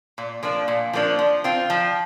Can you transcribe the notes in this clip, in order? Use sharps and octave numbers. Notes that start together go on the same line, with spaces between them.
A#2
F3 A#3 D4
A#2
F3 A#3 D4
F3
C4 F4
F3